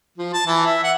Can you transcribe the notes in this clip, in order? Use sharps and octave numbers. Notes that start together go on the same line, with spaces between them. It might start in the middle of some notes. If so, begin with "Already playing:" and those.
F3
A5
E3
E5
F#5